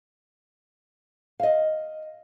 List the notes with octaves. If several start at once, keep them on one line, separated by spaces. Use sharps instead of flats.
D#5 F5